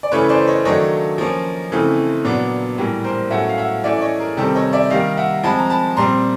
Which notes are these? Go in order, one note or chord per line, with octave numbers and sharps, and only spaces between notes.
D5
C#3 E3 A3 C#4 B4 C#5
C5 D5
C#5 D#5
D#3 F#3 A3 D4 C#5 D#5
F3 A#3 C#4
C#3 E3 A3 C4
A#2 F#3 B3 D4
A2 E3 G3 A#3
A#4 C5
A2 F#3 A3 C#4 E5 F#5
F5
E5 F#5
E3 A3 C#4 D5 E5
D5
C#5 D#5
G#4 A#4
C3 D#3 G3 C4 G4 A4
C#5 D#5
D5 E5
D#3 G3 A#3 D#5 F5
E5 F#5
F3 G#3 C4 A5 B5
A#5
A5 B5
A#2 G3 C4 A#5 C6